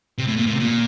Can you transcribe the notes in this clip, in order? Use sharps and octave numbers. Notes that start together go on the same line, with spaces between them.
C3
A2
A#2
A2
C3
A#2